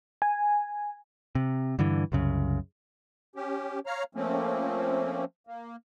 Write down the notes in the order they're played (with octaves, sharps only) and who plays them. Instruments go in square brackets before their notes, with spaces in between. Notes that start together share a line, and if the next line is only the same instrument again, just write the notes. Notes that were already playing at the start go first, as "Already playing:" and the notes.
[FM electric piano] G#5
[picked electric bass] C3
G2 D3 E3
C2 F#2 C#3
[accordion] C#4 G4
C#5 F5 A#5 F6
F3 A3 A#3 C4 C#4
A#3